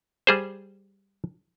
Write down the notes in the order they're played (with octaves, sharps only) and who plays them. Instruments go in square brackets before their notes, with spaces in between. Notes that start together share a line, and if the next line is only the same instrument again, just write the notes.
[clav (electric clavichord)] G3 G#4 C5